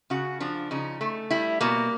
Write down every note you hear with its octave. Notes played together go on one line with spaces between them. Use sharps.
C#3 F#4
F3 D4
C#3 D#4
A3
G3 E4
B2 A#3